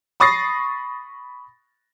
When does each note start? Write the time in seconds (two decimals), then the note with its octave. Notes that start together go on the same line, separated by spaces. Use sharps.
0.20 B5 C#6 D#6 A6 A#6 C7